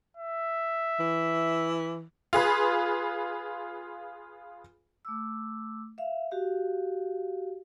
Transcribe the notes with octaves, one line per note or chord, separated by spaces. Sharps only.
E5
E3
F4 G#4 B4
A3 D6 E6
E5 F5
F#4 G4 F5